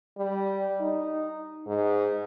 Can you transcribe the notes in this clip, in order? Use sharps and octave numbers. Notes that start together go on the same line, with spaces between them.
G3
D#4
G#2